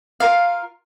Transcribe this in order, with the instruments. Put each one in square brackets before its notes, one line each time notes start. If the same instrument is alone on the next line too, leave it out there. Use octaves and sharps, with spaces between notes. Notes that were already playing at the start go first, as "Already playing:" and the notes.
[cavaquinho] F4 A#4 F5